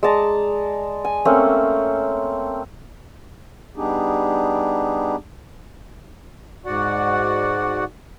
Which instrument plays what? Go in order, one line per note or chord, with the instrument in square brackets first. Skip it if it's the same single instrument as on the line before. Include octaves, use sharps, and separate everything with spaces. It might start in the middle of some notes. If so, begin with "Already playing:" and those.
[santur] G#3 D5 A5 A#5
G#5
A3 A#3 C4 C#4
[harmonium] G3 B3 D4 D#4 G4 G#4
G#2 F#4 D5 F#5